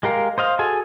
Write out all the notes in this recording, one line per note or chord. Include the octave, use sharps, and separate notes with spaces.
G#3 G4 A#4 F5
C5 D#5 F5
F#4 G#4 A4 G#5